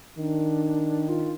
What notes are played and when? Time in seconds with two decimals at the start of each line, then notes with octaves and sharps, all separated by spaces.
0.18 D#3 D4
1.08 F4